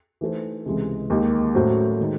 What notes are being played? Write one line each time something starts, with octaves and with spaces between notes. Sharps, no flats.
E3 A3 D#4 A4 C5
C#2 C3 E3 G#3
D#2 D#3 G#3
A2 F#3 C#4 F#4 C5
D#3 G#3 D#4 G#4